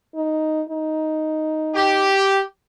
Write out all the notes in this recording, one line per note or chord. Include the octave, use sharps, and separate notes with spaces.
D#4
D#4
G4